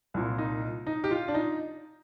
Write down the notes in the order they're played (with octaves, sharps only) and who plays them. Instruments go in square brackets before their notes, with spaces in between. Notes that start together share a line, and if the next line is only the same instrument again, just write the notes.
[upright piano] C2 A#2
D#4
D#4
G4
F4
D4
D#4